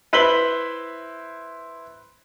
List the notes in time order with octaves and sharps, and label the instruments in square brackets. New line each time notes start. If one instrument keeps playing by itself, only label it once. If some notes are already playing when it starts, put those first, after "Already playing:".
[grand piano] E4 B4 C5 B6 F#7 G7